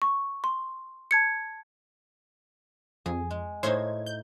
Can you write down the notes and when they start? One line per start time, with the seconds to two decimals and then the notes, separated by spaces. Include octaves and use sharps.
0.02 C#6
0.44 C6
1.11 A5 G#6 C#7
3.06 F2 G#4
3.31 G#3
3.63 A2 D#4 C5 C#5 G#6
4.06 G6